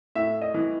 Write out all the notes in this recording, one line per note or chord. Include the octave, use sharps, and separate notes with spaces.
A2 E5
D#5
E3